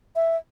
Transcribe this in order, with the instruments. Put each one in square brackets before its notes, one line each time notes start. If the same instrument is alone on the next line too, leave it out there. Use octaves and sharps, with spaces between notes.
[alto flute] E5